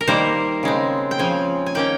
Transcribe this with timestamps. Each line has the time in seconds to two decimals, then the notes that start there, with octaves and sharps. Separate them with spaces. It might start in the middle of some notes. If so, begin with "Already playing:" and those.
0.01 A#4
0.07 D#3 G3 A#3 C5
0.63 C#3 G#3 C4
1.11 G5
1.19 C#3 F3 C4 G#5
1.66 G#5
1.75 D#3 A#3 C#4 G5